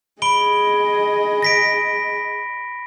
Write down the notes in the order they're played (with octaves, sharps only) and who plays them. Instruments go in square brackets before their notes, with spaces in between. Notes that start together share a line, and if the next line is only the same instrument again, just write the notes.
[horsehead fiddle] G#4 D#5 [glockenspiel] B5 D7 G7
[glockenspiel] A#6 B6 D7